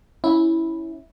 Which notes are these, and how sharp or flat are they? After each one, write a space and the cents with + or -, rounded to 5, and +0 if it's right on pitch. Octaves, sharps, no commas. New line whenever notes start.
C#4 +0 E4 -10